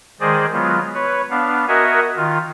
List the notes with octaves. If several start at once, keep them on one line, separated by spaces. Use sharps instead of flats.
D#3 G#3 G#4 C5 D5 D#5
F#3 G#3 B3 F4
B4 C#5
B3 D4 F5
F#4 A#4 D#5 E5 F#5 G#5
D#3 F4